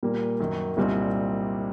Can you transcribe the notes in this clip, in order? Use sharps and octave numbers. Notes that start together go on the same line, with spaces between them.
A#2 G3 A#3
F#2 D#3 F#3
C2 A#2 G3 C4 D#4